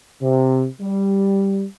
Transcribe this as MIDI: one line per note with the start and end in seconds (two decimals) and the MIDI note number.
0.21 0.65 48
0.81 1.65 55